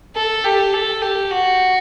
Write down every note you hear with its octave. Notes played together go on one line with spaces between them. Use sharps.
A4
G4
A4
G4
F#4